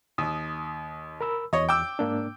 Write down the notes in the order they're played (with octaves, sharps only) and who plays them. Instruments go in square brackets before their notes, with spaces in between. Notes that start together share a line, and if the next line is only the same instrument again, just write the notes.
[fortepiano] D#2 [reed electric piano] D#6
[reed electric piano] A#4 B5 E6
[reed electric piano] E2 [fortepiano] C#5 D#5
[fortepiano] G5 D6 E6
[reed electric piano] G#2 A#3 D4